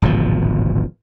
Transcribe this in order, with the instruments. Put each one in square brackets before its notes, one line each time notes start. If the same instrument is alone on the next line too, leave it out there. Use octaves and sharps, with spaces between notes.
[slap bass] D1 G#1 B2 F3